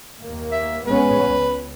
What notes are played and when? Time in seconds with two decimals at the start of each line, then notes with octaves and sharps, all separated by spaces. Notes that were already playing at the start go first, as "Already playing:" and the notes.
0.23 D#2 A#3
0.52 E5
0.87 G#3 B3 C#4 B4
1.26 C#2